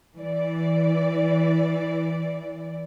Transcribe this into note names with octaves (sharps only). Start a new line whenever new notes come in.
E3 D5